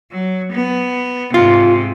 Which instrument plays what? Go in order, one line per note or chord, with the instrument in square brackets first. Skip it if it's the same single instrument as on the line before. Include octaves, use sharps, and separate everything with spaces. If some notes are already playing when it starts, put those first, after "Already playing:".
[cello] F#3
B3
[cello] G#2 C3 [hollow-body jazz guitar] F4